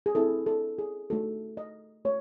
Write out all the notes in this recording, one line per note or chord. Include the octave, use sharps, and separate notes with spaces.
G#4
C4 E4 A4
A4
G#4
A3 D#4 F#4 A4
D#5
A3 C#5